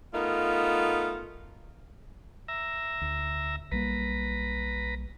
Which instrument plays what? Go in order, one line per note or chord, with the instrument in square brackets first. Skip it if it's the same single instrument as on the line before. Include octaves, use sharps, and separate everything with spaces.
[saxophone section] A3 B3 D#4 F4 A#4
[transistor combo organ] E5 A#5
[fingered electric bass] D2
[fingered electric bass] B1 G3 A#3 [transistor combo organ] B4 A#5